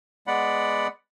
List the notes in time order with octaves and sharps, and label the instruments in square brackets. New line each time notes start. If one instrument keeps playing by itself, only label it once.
[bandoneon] G#3 B3 D5 F#5 B5